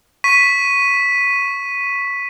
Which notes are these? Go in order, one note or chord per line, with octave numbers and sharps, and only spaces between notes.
C#6 B6 D#7